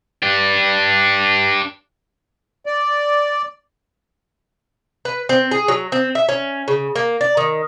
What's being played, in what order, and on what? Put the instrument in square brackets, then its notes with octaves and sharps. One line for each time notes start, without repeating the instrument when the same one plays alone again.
[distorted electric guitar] D4 G4
[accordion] D5
[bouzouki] B4
C4
G#4
F#3
C4
E5
C#4
C#3
A#3
D5
D#3